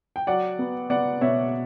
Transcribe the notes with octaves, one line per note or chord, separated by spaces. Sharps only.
G5
F#3 D5 F#5
B3
B3 D5 F#5
B2 C#5 E5